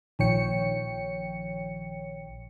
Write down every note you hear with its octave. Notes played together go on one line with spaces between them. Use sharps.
A#1 D#3 F3 C#5 G5 C#7